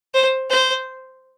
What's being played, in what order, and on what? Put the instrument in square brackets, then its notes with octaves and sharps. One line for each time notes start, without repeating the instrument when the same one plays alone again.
[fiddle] C5
C5